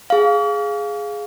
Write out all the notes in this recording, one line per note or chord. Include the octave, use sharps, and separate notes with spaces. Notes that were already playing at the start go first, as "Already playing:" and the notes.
G#4 F5